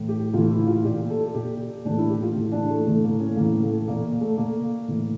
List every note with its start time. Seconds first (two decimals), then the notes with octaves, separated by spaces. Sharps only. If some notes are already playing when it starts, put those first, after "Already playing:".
Already playing: A2 E3
0.09 G4
0.33 A2 E3 F4
0.51 E4
0.67 F4
0.84 A#2 G4
1.10 A4
1.34 A#2 G4
1.85 A2 E3 D4
1.98 E4
2.10 G4
2.23 F4
2.35 A2 E3
2.52 D4
2.70 A3
2.86 A2 E3 A3
3.04 A#3
3.20 C#4
3.36 A2 E3 A#3
3.62 A3
3.88 A#2 A#3
4.21 A3
4.37 A#2 A#3
4.88 A2 E3